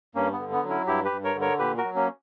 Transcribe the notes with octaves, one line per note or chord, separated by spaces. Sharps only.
G2 A#3 C#4
B3
D3
B3
F#3
C#4 E4
G2 E4 G4
G4 B4
G2
A#4 C#5
D3
A#4 C#5
A#2 G4 B4
F#4 A#4
F#3
A#3 C#4